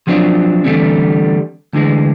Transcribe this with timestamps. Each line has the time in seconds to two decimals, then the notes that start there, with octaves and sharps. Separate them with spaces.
0.07 F3 F#3 C4 D4 F4
0.65 D3 E3 G3 A3 C4 C#4
1.73 D2 D3 E3 G#3